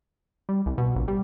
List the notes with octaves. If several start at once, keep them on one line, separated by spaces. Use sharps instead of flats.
G3
C2
B2
A#1
G3